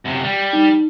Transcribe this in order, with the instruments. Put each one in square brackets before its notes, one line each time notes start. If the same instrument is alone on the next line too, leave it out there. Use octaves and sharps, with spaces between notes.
[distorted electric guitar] F#2 C3
G3
[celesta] D#4